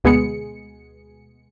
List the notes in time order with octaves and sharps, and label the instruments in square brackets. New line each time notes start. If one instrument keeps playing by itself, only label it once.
[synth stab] D2 B2 G#3 B3 G#4 C#7